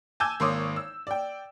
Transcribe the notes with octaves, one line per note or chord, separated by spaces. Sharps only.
G#5 A5 D6 E6 G6 G#6
G#1 A#3 C#5 C6 D6 D#6
E6
D5 G5